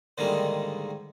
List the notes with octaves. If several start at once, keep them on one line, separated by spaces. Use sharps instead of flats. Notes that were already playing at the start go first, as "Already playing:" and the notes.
G#2 D3 D#3 G3 G#3 A#3